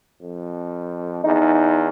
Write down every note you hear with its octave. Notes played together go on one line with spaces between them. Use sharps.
F2
E2 D#4